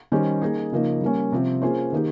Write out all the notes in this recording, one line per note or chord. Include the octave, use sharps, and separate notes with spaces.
D#3 G3 C#4 G4 C5
A#3 D#4 G#4
C#3 F3 A#3 D#4
G3 A#3 C#4
C3 F3 C4
A#3 C#4 F4 G#4 C5
D#3 A#3 D#4 G4